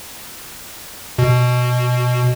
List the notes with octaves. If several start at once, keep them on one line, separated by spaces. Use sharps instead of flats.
B2